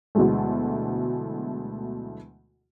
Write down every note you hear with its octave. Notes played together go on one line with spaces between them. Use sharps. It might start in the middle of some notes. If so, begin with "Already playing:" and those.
D2 B2 E3 F#3 G#3 A3